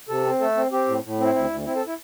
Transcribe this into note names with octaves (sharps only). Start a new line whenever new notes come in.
C3 A4
C4
A3 A4
C4
C4 G4
A2
A2
C4
E4
D2 E4
D2
C4 E4
A4
E4